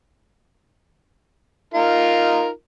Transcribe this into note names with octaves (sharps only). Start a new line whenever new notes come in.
D#4 F4 A#4